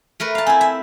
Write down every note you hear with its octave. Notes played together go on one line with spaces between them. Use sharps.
A3 A#4 B4
F5 A5
C4 E4 G#5
E5